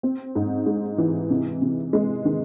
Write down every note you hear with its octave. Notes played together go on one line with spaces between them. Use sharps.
C4
G#2
G#3
E3
C3
C3
G#3
D#3